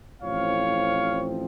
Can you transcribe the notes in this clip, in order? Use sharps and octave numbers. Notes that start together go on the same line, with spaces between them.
A1 A2 F3 C4 C#5 F5